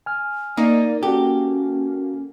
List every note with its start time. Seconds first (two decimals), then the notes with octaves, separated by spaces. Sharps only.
0.06 G#5 F6
0.57 A#3 D#4 D5
1.03 C#4 F#4 G4 A4